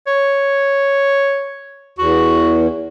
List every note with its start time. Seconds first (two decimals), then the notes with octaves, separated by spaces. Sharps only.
0.07 C#5
1.99 E2 F#4